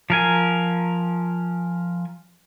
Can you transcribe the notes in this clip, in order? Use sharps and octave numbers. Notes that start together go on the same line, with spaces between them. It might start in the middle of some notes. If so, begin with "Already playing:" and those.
F3 A#4 G#5